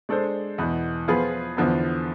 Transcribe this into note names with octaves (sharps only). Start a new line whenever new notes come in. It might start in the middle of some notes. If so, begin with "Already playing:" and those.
G#3 D4 A4 C5
E2 B2 B3
F3 B3 F4 G#4 B4
E2 D3 F3 B3